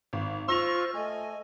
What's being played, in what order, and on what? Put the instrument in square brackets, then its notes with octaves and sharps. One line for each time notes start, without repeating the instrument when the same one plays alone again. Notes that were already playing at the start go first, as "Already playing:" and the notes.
[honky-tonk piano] G#1
[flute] F4 [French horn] C5 [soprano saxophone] C#6 [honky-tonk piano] E6 A#6 F7
[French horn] A3 [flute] D#5 [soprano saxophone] G#5